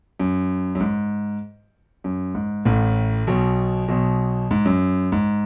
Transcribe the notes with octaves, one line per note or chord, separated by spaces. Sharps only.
F#2
F#2
G#2
F#2
G#2
A1 A2
B1 B2
B1 B2
G#2
F#2
G#2